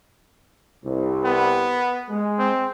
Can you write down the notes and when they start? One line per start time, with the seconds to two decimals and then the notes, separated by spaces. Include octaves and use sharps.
0.84 C2
1.25 B3
2.09 G#3
2.39 C4